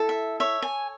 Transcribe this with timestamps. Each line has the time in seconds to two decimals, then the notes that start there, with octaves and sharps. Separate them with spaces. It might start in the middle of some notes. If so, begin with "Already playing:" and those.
Already playing: E4 A4
0.09 E5
0.40 C#5 E5
0.62 G#5